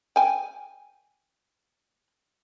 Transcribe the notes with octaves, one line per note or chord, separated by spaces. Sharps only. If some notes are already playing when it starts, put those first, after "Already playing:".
G5 G#5